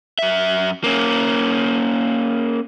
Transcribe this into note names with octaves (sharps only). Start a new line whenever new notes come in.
F#2 E5
A#3 C#4